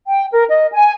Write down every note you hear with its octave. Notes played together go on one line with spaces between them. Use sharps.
G5
A#4
D#5
G#5